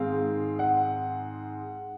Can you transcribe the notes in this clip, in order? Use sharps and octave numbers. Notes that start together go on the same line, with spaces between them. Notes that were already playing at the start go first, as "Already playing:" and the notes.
Already playing: G#2 D#3 G#3 C4 F5
F#5